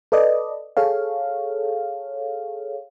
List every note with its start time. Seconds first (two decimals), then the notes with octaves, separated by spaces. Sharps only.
0.12 A4 B4 D5 D#5
0.77 G#4 A4 C#5 F5